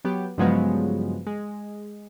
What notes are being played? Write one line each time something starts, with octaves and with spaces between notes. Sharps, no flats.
F#3 B3 G4
G2 C#3 F3 F#3 G#3 B3
G#3